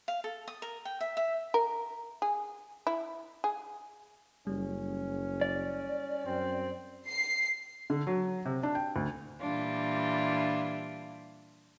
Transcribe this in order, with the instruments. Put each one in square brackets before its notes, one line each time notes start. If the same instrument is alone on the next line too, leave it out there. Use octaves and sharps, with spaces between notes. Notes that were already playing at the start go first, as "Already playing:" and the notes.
[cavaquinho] F5
A4
D#6
A#4
G5
E5
E5
[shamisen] A#4
G#4
E4
G#4
[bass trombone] F#1 [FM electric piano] G3 [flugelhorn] C#4
[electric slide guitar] D5
[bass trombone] F#2 [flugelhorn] C4
[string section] C7
[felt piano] D3
F#3
C3
D4
G5
D2
[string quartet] A#2 E3 G3 D4 F4